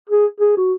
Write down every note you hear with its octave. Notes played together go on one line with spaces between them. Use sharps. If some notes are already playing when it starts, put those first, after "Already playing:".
G#4
G#4
F#4